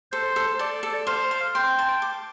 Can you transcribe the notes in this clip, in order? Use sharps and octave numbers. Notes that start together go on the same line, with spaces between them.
A4 C5
A4
A4 D5
A4
C5 F5
C5
G5 C6
A5
D6